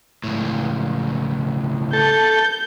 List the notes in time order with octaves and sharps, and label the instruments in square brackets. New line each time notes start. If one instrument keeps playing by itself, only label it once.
[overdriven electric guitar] C#2 A2
[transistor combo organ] A4 [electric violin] G6